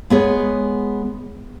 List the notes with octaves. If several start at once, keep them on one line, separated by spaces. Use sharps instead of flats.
G#3 B3 G#4 C#5